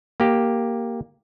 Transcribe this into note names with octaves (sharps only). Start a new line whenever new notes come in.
A#3 G4